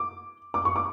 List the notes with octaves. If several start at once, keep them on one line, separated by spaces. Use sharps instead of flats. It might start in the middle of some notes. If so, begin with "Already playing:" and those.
Already playing: D6
D6
C#6
D6